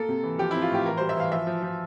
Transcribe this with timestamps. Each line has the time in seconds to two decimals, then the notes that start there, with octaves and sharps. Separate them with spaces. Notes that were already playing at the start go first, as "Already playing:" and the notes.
Already playing: A#3 A4
0.09 C3
0.23 E3
0.38 F3 G4
0.51 C4 E4
0.62 F4
0.70 A2 G4
0.85 E3 A#4
0.98 G3 C5
1.09 E5
1.17 E3 F5
1.32 F3 E5
1.47 F3
1.63 F3